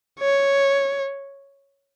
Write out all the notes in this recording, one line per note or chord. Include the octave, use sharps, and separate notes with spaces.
C#5